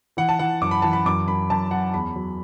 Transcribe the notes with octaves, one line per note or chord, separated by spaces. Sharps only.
E3 F#5
A5
E3 F#5
F#2 D6
B5
E3 A5
B5
F#2 D6
F#2 B5
F#2 A5
F#3 F#5
E2 B5
F#3